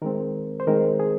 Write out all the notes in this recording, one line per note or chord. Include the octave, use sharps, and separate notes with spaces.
D#3 G#3 C4 A#4
C5
D#3 G#3 C4 A#4
G#4